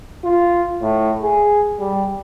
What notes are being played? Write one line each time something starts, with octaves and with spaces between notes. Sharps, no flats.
F4
A2
G#4
G3